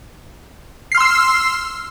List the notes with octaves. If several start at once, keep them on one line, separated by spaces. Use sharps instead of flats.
C6 E6 F6 C7